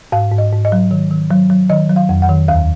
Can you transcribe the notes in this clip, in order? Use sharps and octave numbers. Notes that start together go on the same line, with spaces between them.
G#2 F5
G#2
D#5
G#2
D#5
F#3
D#3
D#3
F#3
F#3
D#3 D#5
F#3
F5
F2
F#5
D#3
D#2 F5